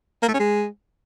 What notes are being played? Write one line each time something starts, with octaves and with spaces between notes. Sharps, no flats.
A#3
A3
C#4
G#3